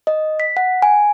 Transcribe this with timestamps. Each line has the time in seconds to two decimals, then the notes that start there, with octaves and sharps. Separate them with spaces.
0.07 D#5
0.40 B6
0.57 F#5
0.82 G#5